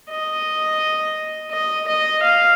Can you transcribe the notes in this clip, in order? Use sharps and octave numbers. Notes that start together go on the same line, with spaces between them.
D#5
D#5
D#5
F5